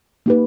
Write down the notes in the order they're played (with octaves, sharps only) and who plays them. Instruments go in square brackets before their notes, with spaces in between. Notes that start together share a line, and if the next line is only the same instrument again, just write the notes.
[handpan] A#3 D#4 G4 B4